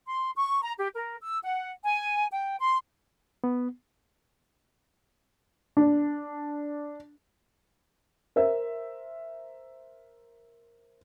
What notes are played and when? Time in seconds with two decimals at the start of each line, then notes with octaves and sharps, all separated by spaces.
0.07 C6
0.36 C#6
0.63 A#5
0.77 G4
0.95 A#4
1.20 E6
1.44 F#5
1.85 G#5
2.31 G5
2.60 C6
3.44 B3
5.77 D4
8.36 A#4 C5 E5